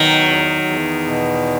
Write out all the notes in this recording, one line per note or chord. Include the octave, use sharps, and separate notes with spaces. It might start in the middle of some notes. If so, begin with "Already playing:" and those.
Already playing: B2 D#3 F#3
E2
E2
B2